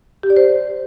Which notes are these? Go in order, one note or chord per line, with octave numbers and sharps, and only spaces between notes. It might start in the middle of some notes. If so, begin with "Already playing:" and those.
G4
D5
C5